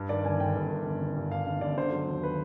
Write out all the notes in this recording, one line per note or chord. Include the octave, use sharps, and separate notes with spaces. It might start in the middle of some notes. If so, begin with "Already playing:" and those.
Already playing: G2
D#3 D5
G1 G#5
G1 G5
G2
D#3
G1
G1
G2
D#3 F5
G1
G1 D5
D3 C5
F#3
D#2
B4